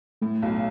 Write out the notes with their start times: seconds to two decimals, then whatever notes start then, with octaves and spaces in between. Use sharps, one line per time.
0.22 A2 A3
0.42 B1